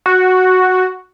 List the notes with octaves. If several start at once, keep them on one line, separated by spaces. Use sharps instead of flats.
F#4